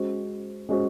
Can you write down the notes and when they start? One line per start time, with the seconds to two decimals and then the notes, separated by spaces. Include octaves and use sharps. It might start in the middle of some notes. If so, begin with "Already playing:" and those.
Already playing: G#3 C#4 F#4 C5
0.69 G#3 C#4 F#4 C5